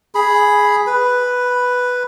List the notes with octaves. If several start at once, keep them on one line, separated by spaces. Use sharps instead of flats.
G#4 B5
B4